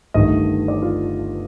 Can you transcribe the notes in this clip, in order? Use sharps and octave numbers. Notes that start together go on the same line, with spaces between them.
G1 G2 D#3 A3 D#5
D5
F4